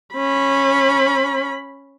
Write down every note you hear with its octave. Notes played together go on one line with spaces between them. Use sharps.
C#4 B5